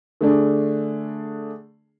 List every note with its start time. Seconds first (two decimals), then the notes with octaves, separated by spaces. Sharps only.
0.21 D3 A3 D4 G#4